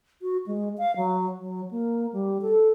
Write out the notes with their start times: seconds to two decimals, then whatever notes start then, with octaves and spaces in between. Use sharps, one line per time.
0.22 F#4
0.46 G#3
0.78 F5
0.96 F#3
1.40 F#3
1.71 A#3
2.13 G3
2.42 A4